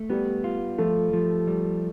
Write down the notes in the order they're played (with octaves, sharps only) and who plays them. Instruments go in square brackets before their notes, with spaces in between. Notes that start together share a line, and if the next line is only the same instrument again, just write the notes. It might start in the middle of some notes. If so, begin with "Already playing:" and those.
Already playing: [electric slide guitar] A3
[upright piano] G3 [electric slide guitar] B3
[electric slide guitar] F4
[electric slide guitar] F3 [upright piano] A3
[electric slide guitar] F3
G3